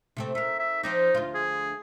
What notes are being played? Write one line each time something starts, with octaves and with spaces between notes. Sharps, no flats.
C3 A3 C4
D#4 A#4 E5
E5
F3 C4 D#4 D5
D2 F4
G#4